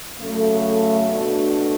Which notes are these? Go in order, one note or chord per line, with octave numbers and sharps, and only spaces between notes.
C#3 F#3 A3
B2 A3 D4 F#4